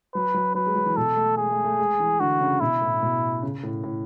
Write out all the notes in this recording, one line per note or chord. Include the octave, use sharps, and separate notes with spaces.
F#3 B4
F#3
F#3 B4
G#3
F#3
E3
B2 A4
A3
G#3 G#4
A3
A3
G#3
E3
D3 F#4
C#3
B2 E4
A2
B2
C#3
A2
A2